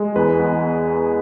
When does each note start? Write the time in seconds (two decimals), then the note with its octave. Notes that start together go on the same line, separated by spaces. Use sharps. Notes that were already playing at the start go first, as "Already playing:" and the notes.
Already playing: G#3
0.16 E2 B4
0.39 B3